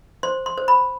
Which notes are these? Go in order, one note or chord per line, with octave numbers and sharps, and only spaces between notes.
C5 C6
C6
C5
B5